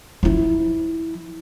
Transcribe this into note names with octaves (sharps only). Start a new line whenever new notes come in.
F3 E4